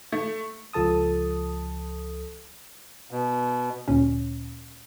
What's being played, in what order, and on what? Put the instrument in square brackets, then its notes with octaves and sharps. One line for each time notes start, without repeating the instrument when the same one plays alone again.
[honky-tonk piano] A3
[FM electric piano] C#2 F3 A4 A5 D#6
[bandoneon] B2
[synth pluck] D2 A#2 C#4